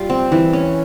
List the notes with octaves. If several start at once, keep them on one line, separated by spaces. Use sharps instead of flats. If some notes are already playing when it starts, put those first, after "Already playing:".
Already playing: G3 F4
C4
E3
C#4